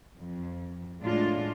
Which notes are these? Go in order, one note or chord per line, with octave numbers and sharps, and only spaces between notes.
F2
A2 G#3 D4 F4